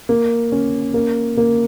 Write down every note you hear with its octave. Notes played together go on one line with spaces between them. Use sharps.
A#3
C#4
A#3
A#3